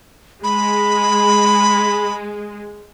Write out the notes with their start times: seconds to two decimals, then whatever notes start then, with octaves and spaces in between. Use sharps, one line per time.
0.44 G#3 B5